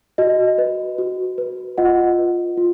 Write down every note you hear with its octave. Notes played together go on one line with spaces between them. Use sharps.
F#4 D#5
B4
F#4
B4
F4 D#5 F#5
B4
F4